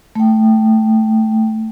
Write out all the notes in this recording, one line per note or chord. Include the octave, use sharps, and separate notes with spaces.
A3 G5